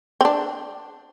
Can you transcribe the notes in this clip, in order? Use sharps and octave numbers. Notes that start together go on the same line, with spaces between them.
C4
D4